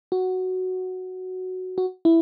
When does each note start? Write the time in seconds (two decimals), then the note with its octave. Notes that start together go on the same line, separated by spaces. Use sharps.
0.12 F#4
1.78 F#4
2.05 E4